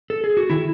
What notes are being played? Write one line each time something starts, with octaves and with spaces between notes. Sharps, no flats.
A4
G#4
F#4
D#3 E4